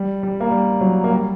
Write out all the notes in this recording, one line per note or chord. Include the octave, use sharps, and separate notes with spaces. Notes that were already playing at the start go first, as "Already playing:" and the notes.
Already playing: G3
G3
A#3
G3
F#3
A#3
G3